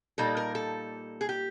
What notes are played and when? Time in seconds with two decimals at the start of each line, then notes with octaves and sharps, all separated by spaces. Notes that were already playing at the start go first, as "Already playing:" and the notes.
0.18 A#2 G3 A#3 D#4 A4
0.37 A#4
0.55 A4
1.21 G#4
1.29 G4